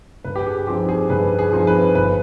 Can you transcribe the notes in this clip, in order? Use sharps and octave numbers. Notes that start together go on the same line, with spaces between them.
G2 B4
G4
G#4
F3 C4 D#4 G4
G#4
G2 B4
G#4
F3 C4 D#4
B4
G1 B4